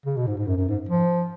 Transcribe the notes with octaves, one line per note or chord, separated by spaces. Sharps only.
C#3
B2
G#2
G#2
F#2
F#2
G#2
F3